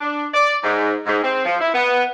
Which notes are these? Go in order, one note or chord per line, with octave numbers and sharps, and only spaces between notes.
D4
D5
G#2
G#2
C4
F3
E4
B3